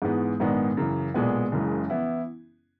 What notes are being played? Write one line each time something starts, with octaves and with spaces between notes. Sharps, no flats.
G#2 E3 G#3 B3
A#1 G#2 D#3 G#3 B3
F#2 C#3 E3
B1 A#2 G#3 B3
F#1 F#2 C#3 E3 G#3
E3 B3 E4